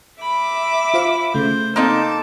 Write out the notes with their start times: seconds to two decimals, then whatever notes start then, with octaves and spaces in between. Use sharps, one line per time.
0.22 E5 B5 D6
0.94 F4 C5 F5
1.34 C#3 A3 C5
1.76 A#3 C4 D#4 A4 D#5 A5 D6